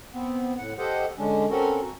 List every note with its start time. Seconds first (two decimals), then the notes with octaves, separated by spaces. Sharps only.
0.13 B3 C4
0.58 A2 F#5
0.78 G4 A4 C5 D#5 F#5
1.18 D3 G#3 C#4 D4
1.51 C4 C#4 F#4 A4 A#4
1.81 F#4